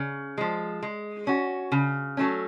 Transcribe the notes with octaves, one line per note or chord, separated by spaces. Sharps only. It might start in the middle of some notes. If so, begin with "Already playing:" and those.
Already playing: C#3
F3 G#3
G#3
C#4 F#4
C#3
F#3 A3 C#4